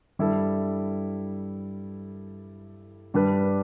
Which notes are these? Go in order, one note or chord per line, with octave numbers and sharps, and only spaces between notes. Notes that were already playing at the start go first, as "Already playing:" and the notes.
G2 G3 E4 A4
G2 G3 D4 B4